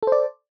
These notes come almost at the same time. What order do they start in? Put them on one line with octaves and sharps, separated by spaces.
A4 C5 D5